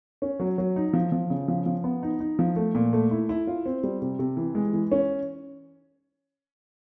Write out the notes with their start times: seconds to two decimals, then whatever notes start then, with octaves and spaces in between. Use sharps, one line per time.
0.22 C#4
0.40 F#3
0.58 F#3
0.76 D#4
0.93 F3
1.12 F3
1.30 C#3
1.48 F3
1.66 F3
1.84 B3
2.03 D#4
2.20 D#4
2.39 F3
2.56 A3
2.75 A#2
2.93 A3
3.11 E4
3.29 E4
3.47 F4
3.66 C4
3.83 G3
4.02 C3
4.19 C3
4.37 E3
4.55 G#3
4.73 E3
4.92 C#4